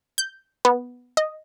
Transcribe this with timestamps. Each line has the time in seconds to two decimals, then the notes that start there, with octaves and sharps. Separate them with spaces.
0.18 G6
0.65 B3
1.17 D#5